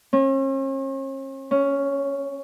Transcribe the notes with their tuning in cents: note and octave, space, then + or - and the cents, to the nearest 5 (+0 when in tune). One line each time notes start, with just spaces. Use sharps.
C#4 -45
C#4 +5